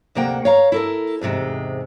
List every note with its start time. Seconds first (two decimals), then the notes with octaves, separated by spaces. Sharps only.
0.15 D2 C3 A#3 F#5 G5
0.45 C#5 F5 A#5
0.72 E4 A4 A#4
1.21 E2 G#2 C3 G#3